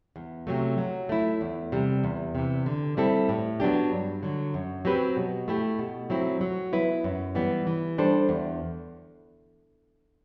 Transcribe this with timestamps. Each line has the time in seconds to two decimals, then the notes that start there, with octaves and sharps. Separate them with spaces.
0.16 E2
0.47 C3 F#3 A3
0.78 F#3
1.09 A3 E4
1.41 E2
1.72 C3 G3
2.04 E2
2.35 C3 E3
2.66 D3
2.97 G3 C4 E4 A4
3.29 A2
3.60 F#3 B3 D4 G4
3.91 G2
4.23 D3 F#3
4.54 F#2
4.85 F#3 C4 G4 B4
5.16 B2
5.48 A3 E4 G4
5.79 B2
6.10 F#3 C4 E4
6.41 F#3
6.72 B3 E4 B4
7.04 F#2
7.35 E3 G3 B3
7.67 E3
7.98 G3 D4 A4 C5
8.29 E2